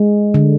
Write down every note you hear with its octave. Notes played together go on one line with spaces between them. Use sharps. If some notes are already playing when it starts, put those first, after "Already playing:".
Already playing: G#3
D3